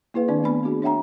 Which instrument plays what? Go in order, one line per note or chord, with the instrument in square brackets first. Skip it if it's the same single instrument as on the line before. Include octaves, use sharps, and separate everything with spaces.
[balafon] A#3 E4 G#4 B4 F5
D#3 C4 D4 D5
A3 B3 B5
C4 D4 F#4 G#4
D4 C#5 E5 F#5 G5 A#5